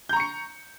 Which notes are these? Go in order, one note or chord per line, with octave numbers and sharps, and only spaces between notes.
A#5 C#6 G6 C#7